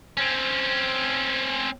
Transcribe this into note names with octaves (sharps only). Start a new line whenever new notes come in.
C4 C#4